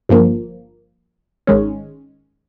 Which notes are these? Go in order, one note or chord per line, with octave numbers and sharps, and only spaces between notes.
G1 G2 F3 A#3
G#1 G#2 D#3 G#3 C#4